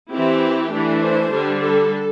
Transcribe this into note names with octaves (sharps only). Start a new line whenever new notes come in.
E3 C4 E4 G4
E3 A3 D4
C5
D3 G3 D4
A4